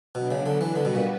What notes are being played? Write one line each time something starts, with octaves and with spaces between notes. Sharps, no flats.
B2 F#3 B3 D4
C#3
D3
E3
D3 G3 B3 F#4 B4
B2
A#2